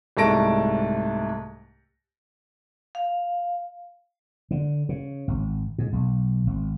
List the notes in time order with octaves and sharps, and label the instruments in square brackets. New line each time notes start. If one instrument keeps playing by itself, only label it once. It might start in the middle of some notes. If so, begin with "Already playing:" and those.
[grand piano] C2 G#2 A3 A5 A#6 D7
[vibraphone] F5
[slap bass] D3
C#3
G#1
G#2
B1
G#1